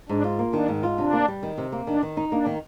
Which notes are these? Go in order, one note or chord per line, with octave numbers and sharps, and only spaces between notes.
G#2 D4
F4
A#3
D#3 D4
G#2
F4
C3 D4
A#3
G3
D#3
C3
A#3
D#3 D4
D#3
D#4
A#3 D4
D#3